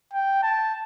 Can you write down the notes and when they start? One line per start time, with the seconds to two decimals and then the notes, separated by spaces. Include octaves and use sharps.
0.13 G5
0.43 A5